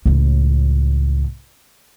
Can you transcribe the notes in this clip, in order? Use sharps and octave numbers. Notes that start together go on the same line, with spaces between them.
C#2 A2